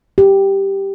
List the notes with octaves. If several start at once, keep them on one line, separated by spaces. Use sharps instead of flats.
G4